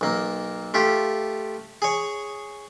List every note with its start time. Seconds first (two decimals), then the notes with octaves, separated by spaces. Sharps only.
0.01 B1 A#3
0.74 A3 F4 G4
1.82 G#4 C#5